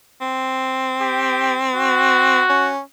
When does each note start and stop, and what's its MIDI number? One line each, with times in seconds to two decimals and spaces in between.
0.21 2.43 60
1.01 1.56 67
1.75 2.70 66
2.49 2.80 61